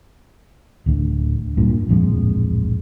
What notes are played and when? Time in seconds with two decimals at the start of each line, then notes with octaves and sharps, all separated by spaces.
0.86 D1 D2 D3
1.57 G2 A#2
1.88 D1 A#1 F2 G#3